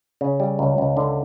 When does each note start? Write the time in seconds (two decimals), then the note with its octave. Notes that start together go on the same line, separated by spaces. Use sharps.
0.21 C#3
0.40 G3
0.59 C#2
0.78 C#2
0.97 D3